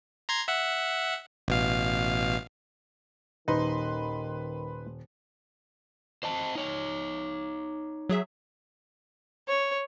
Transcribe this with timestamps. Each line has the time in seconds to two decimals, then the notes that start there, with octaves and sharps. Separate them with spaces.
0.29 A#5 C6 G#6
0.48 E5 F#5
1.48 A1 B2 F5
3.48 D#1 D#3 D#4 B4 C6
6.23 C5 D#5 A5
6.55 D#4 C#5
8.09 F#3 G#4 E5
9.48 C#5